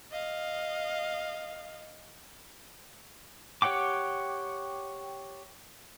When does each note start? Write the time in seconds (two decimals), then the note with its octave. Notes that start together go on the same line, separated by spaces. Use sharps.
0.11 D#5 F5
3.62 G4 C#5 F#5 G5 D6